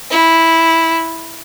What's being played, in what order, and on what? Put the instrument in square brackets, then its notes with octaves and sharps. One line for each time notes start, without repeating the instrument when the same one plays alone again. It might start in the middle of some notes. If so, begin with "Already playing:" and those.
[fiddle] E4